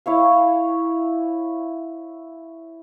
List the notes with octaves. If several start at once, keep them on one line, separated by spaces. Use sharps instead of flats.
E4 C#5 F5